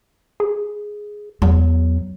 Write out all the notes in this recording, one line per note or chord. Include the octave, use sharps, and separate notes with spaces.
G#4
E2 F#3